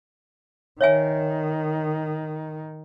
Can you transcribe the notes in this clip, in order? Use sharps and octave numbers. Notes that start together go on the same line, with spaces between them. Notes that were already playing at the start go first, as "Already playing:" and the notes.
D#3 C#5 E5 G#5